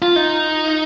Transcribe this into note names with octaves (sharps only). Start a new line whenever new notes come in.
F4
D#4